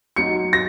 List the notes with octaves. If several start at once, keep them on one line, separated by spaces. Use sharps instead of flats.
F#3 D#4 C#7
A#6